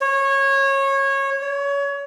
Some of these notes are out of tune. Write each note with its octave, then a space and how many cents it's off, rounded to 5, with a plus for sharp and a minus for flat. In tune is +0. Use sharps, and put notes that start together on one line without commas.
C#5 -20
C#5 +25